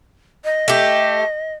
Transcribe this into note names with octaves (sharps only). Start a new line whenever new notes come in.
D#5
A3 G4